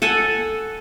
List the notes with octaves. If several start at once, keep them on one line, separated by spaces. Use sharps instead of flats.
A4 F#5 G#5